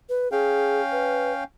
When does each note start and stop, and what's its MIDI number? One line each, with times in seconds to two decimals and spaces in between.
0.09 0.31 71
0.32 1.44 61
0.32 0.81 68
0.32 1.44 77
0.32 1.44 79
0.92 1.33 71